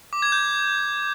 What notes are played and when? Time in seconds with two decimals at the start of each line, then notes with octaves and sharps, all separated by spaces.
0.13 D6
0.22 G#6
0.32 G6